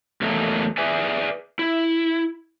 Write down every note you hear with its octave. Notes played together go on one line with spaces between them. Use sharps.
E2 F#3 A3 A#3 D#4
G#4 B4 D5 E5 G#5
E4